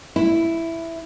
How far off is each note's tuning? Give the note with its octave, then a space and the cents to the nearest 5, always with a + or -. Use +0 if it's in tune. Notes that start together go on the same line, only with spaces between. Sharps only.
E4 +5